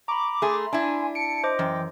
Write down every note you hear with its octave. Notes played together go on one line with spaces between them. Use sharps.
A#5 B5 C#6 D6
A3 G#4 C6
D4 E4 G#5
A5 C#7 D7
C5 D#5 D6
F#2 E3 G5